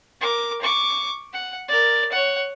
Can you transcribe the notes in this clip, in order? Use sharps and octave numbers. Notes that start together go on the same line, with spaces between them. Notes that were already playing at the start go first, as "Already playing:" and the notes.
A#4 D6
C#6 D6
F#5
A#4 D5
C#5 F#5